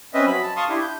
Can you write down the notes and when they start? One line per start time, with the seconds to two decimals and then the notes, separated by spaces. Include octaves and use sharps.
0.14 C4 C#4 B4 D#5 E5
0.26 F#3 B5
0.43 A5
0.57 F5 A5 C6 C#6 D#6
0.69 D4 E4 G4
0.82 G6